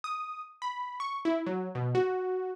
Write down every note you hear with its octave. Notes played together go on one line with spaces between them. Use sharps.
D#6
B5
C#6
E4
F#3
B2
F#4